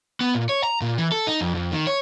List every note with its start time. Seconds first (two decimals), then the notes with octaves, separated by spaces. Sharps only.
0.21 B3
0.35 A#2
0.49 C#5
0.64 A#5
0.82 A#2
0.98 E3
1.12 A4
1.27 D#4
1.41 F2
1.54 F2
1.72 D#3
1.87 C#5